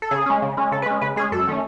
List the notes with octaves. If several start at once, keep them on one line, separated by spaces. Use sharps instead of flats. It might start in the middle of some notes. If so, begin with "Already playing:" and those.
A4
C#3 G#4
G#3 C#4
C#3
G#3 C#4
C#3 A4
B4
G#3 C#4
C#3 B4
G#3 C#4 G#4
F#2 A4
D#3 A3 C#4